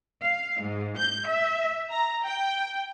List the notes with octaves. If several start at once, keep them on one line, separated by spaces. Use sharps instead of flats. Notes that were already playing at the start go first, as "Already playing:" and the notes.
F5
G#2
G6
E5
A#5
G5